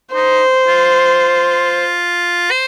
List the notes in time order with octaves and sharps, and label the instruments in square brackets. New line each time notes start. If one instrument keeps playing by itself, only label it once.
[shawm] D#4 [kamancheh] C5
[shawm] F4
C5